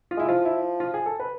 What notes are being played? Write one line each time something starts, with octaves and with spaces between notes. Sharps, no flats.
F4
G#3 E4
F3 F4
E4
F4
G#4
A4
B4